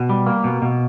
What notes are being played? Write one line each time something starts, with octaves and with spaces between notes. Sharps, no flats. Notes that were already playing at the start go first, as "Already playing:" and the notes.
Already playing: B2
G3
A#3
B2
B2